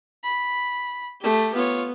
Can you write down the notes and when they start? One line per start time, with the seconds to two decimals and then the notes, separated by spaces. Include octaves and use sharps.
0.24 B5
1.21 A3 G4
1.54 B3 F4 C#5